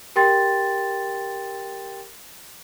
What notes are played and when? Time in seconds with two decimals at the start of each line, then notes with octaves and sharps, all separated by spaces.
0.16 G4 A#4 G5 C6 A6